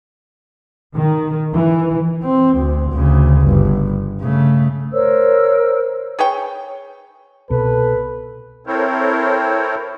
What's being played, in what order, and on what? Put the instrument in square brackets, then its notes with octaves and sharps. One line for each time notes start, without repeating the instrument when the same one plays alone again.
[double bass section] D#3
E3
[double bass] C4
D2
D2 C#3
G1
C#3 A3
[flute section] A#4 C5 C#5 E6
[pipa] G#4 B4 C#5 G5
[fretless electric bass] C2 B2 [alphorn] A4 [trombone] B4
[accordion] C4 E4 A4 A#4 C5 C#5